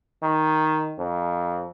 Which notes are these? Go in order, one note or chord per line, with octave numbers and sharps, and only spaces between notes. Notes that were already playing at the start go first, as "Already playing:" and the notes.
D#3
F2